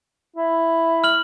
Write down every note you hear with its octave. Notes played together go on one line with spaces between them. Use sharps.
E4
F6 F#7